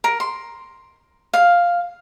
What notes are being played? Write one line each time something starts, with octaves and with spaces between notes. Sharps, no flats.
A#4
C6
F5